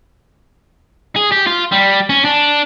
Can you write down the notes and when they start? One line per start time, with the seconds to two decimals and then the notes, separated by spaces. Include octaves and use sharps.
1.16 G#4
1.32 G4
1.47 F4
1.72 G3
2.10 C#4
2.25 D4